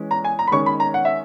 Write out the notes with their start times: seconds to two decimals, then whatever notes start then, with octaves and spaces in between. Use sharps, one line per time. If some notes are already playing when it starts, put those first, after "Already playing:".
Already playing: E3 G#3 C#4
0.11 A#5
0.24 G#5
0.39 A#5
0.47 B5
0.52 D#3 G#3 C#4 C#6
0.66 B5
0.80 A#5
0.94 F#5
1.05 E5